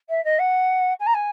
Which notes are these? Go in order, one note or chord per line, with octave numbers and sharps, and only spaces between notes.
E5
D#5
F#5
G#5
A#5
G#5